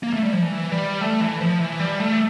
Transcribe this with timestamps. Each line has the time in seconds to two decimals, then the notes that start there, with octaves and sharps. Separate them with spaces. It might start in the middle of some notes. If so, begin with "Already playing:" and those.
0.03 A#3
0.13 A3
0.23 G3
0.33 F3
0.42 E3
0.72 G3
1.01 A3
1.21 E3
1.40 F3
1.60 E3
1.80 G3
2.00 A3